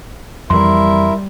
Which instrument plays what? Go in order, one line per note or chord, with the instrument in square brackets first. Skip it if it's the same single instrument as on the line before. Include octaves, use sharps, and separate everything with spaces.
[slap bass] F2 E3 [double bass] G3 [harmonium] E4 A#4 E5 [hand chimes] C6